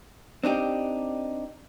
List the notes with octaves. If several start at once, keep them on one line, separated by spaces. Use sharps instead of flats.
C4 D4 D#4 G4